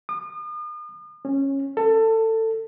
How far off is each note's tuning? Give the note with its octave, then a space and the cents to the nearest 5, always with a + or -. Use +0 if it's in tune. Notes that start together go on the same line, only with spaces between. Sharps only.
D#6 -40
C#4 -15
A4 +20